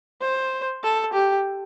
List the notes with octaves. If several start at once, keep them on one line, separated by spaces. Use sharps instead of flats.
C5
A4
G4